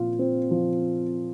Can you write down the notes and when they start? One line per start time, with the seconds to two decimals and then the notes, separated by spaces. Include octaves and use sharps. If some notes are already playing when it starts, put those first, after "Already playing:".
Already playing: A#2 F3 C4 F4
0.19 C4
0.51 F3